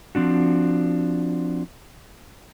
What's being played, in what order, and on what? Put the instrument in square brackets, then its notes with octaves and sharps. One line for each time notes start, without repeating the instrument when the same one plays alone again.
[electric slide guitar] F3 C4 D4 F#4